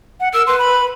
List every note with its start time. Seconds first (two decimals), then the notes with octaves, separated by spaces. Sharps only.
0.20 F#5
0.34 A#4 E6
0.47 B4 C6
0.59 B5